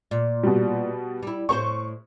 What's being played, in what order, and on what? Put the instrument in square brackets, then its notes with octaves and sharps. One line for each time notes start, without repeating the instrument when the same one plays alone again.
[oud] A#2
[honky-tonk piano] B2 G3
[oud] G3 E4
[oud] A2 A#4 C5 [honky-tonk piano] C#6